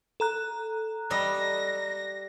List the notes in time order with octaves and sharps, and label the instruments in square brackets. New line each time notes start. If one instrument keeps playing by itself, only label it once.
[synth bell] A4 A#5 F#6
[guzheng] G3 D#5 E5 [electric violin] A#6